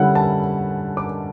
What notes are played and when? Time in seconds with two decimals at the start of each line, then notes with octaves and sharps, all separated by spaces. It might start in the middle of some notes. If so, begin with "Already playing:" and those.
Already playing: D3 G3 C#4 E4 F#5
0.15 A5
0.97 D6